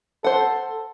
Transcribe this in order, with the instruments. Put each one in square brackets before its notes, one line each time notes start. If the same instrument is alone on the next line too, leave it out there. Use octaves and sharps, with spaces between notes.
[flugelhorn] A4 [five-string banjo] C5 F#5